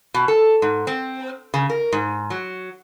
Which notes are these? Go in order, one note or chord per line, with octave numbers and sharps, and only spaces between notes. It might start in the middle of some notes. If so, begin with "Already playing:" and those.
B2
A4
G#2
C4
C#3
A#4
G#2
F#3